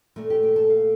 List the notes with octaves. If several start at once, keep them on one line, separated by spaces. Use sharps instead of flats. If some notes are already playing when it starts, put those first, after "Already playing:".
A#2 A3 A#4
G4
G4
A4
F5